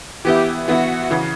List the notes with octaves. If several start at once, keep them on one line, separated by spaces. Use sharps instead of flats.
E3 B3 E4 G4
E3 B3 E4 F#4
C#3 E3